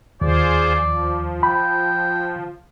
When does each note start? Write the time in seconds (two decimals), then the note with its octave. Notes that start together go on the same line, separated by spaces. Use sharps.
0.21 D#2 F4 G#4 C5 D5
0.78 F3
1.43 G5 B5